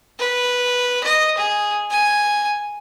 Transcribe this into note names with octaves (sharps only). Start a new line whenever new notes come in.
B4
D#5
G#4
G#5